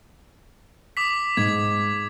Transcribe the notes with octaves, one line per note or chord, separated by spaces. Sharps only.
D6 D#6 B6
G#2 G#6